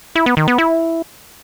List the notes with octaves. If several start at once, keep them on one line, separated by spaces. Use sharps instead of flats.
E4
B3
D#3
B3
E4